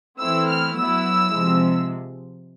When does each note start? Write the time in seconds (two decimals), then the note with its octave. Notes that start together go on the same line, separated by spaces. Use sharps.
0.19 E3 A3 C4 E4 E6
0.48 F6
0.76 F#3 B3 E4 E6
1.33 C3 F3 G#3